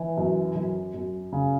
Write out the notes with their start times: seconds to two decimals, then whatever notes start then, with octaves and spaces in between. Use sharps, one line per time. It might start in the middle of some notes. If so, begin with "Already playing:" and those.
Already playing: E3
0.18 F#2
0.55 F#2
0.94 F#2
1.32 C#3